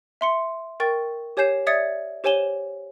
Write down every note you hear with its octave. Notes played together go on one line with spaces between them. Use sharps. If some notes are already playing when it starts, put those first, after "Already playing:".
E5 C6 C#7
A#4 G5 C#6 A6
G4 C#5 G#5 G6 C7 E7
D5 E5 D#6 G#6 A6 C#7
G4 C5 C#5 G#5 E7 G7